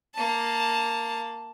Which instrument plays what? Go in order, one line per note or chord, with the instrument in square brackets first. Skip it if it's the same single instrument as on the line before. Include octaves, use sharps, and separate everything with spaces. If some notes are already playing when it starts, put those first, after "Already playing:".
[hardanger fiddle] A#3 A5